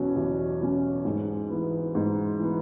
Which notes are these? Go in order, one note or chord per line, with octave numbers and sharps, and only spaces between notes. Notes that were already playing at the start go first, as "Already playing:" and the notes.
Already playing: E2 B2 F#3 C#4
E2
B2 F#3 C#4
G#2 G#4
E3 B3
G#2
E3 B3